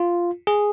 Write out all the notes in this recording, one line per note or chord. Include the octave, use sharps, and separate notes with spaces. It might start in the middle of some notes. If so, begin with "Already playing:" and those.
Already playing: F4
G#4